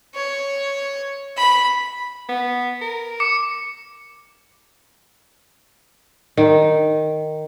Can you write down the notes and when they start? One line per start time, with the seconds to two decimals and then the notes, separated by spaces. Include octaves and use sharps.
0.15 C#5
1.37 B5
2.29 B3
2.81 A#4
3.20 D6 C#7
6.37 D#3